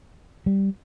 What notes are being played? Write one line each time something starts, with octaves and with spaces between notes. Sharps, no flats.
G3